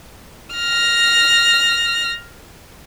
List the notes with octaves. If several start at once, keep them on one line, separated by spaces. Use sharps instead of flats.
F6 A#6